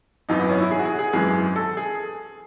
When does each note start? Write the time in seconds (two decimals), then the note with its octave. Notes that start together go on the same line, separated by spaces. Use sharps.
0.29 G#1 F#2 E3 D#4
0.39 B3
0.50 C#4
0.61 E4
0.71 G#4
0.79 F#4
0.85 G#4
0.99 G#4
1.13 G#1 F#2 E3 G#3 G#4
1.56 A4
1.77 G#4